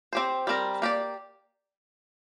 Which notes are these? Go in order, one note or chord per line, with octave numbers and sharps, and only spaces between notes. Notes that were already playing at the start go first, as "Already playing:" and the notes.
C4 G4 C5
G3 C4 A#4
A#3 G4 D5